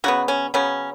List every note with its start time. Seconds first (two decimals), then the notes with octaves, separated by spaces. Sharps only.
0.04 C#3 F#3 B3 F#4
0.28 C#4
0.54 C#3 F#3 B3 C#4